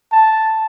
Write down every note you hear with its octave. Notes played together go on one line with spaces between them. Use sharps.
A5